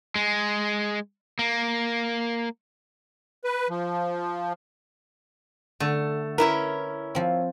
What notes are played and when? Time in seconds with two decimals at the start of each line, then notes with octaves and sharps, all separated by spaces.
0.16 G#3
1.39 A#3
3.44 B4
3.69 F3
5.80 D3 A3
6.38 C#4 E4 A#4 B4
7.15 F3 C4